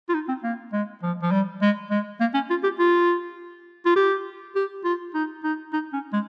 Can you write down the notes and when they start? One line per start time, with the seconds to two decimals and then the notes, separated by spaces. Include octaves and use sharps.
0.09 F4
0.14 D#4
0.28 C4
0.43 A#3
0.73 G#3
1.02 F3
1.22 F3
1.32 G3
1.62 G#3
1.90 G#3
2.20 A#3
2.34 C#4
2.50 F4
2.63 G4
2.79 F4
3.85 F4
3.96 G4
4.56 G4
4.84 F4
5.14 D#4
5.43 D#4
5.73 D#4
5.93 C#4
6.13 G#3